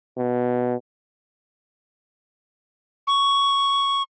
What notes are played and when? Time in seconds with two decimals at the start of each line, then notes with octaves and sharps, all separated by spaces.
0.17 B2
3.07 C#6